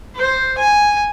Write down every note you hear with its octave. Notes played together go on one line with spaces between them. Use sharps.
C5
G#5